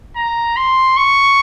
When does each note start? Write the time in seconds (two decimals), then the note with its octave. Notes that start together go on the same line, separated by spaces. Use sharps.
0.16 A#5
0.57 C6
0.97 C#6